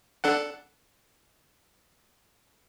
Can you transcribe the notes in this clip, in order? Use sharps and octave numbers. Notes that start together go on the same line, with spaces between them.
D4 A4 F#5